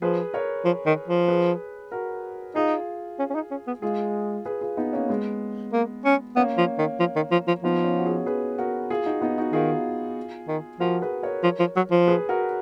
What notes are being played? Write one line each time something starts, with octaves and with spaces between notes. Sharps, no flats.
F3 G#4 B4
A#4 C#5
F3
D#3
F3
G#4 B4
F#4 A#4
D#4 F4 G#4
C#4
C#4
D#4
C#4
B3
G#3 F4 G#4
G#4 B4
F4 G#4
B3 D#4
A#3 C#4
G#3 B3
A#3
C#4
A#3 B3 C#4
F3
D#3
F3
D#3
F3
F3
F3 B3 D#4
C#4 F4
F#4
F4 G#4
G#4 B4
F#4 A#4
F4 G#4
D#4 F#4
B3 D#4
D#4 F#4
D#3 F4 G#4
D#3
F3 F#4 A#4
G#4 B4
A#4 C#5
F3
F3
F#3
F3
G#4 B4
F#4 A#4